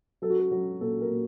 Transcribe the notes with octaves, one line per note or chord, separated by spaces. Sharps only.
F#3 A4
F#4
A4
F#3 F#4
A#2 A4
A#4
A#2